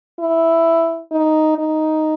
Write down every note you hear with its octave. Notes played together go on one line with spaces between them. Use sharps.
E4
D#4
D#4